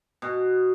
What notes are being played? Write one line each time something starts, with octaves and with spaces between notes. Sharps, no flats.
B2